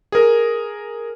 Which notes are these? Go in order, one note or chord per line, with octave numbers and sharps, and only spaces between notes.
G#4 A#4